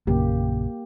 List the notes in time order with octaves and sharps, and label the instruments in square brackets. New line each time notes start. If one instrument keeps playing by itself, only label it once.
[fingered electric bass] A#1 F#2 C#3 [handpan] A#3 G4